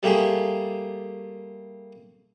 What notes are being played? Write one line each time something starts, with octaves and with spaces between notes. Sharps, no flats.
G3 A3 A#3 G4 G#4